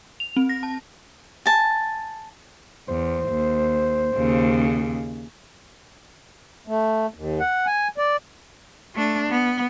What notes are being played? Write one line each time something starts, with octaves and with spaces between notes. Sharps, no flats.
F7
C4
A#6
A5
G#5 A5
E2 C5
D#2
D#2 C#3
A3
D#2
F#5
G#5
D5
A3 D4
B3